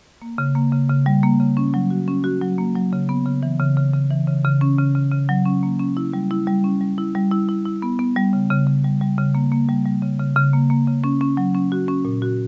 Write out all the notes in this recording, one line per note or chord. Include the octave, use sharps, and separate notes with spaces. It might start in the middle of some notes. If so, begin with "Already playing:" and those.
A#3
C#3
A#3
C#3
C#3
G3
A#3
C#3
C#4
F#3
F#4
C#4
F#4
F#3
A#3
F#3
C#3
B3
C#3
E3
C#3
C#3
C#3
E3
C#3
C#3
C#4
C#3
C#3
C#3
F#3
C#4
A#3
C#4
E4
G3
E4
G3
C#4
G3
E4
G3
E4
E4
E4
B3
B3
G3
C#3
C#3
C#3
G3
G3
C#3
A#3
A#3
G3
G3
C#3
C#3
C#3
A#3
A#3
C#3
C#4
C#4
F#3
C#4
F#4
C#4
A#2
F#4